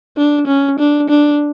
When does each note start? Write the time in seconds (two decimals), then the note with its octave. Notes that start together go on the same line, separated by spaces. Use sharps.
0.17 D4
0.47 C#4
0.79 D4
1.10 D4